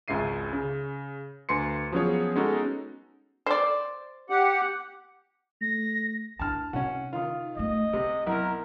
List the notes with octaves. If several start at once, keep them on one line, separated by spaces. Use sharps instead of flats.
G#1 C#2 C#3 E5 C7 D#7
C#3
D2 B4 C6 C#7
F3 F#3 B3 C#4 G#4 C#5
G#3 B3 C#4 D#4 F#4 A4
C5 D5
G4 F#5
A3 A#6
D4 E4 A5 F6
C3 C#4 F#4
D#3 F4
A3 C#4 D#5
C3 C4
B1 E4 A#4